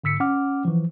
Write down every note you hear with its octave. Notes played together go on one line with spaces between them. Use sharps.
G#2 D3 E6 B6 C#7
C#4 F#5 D6 F6
E3 F3